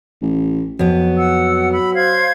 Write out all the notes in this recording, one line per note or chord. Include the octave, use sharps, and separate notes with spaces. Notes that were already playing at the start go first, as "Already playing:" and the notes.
A1
F2 F#3 B3
F#5 E6
B5 E6
C5 F5 G#6